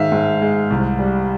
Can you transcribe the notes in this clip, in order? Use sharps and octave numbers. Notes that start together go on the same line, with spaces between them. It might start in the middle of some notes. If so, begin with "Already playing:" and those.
Already playing: G#2 D#3 E5 F5
G#2
G#3
C2
G3